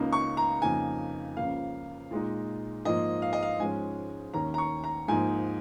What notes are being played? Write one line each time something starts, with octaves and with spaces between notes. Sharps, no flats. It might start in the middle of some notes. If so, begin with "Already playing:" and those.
Already playing: C#2 C#3 A#3 D#4
C#6
A#5
F2 C#3 A#3 D#4 G#5
C#2 C#3 F3 A#3 F5
A#2 G#3 D#4
G#2 F3 A#3 D#5
F5
D#5
F5
G#2 F3 G#3 C#4 G#5
D#2 D#3 C#4 A#5
A#5
C#6
A#5
G#2 F3 A#3 D#4 G#5